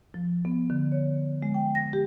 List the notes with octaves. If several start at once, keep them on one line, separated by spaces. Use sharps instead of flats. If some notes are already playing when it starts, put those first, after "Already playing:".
F3
B3
D3
C#5
G#3
G5
A#6
G4